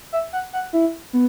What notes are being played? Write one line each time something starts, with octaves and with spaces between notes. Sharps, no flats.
E5
F#5
F#5
E4
B3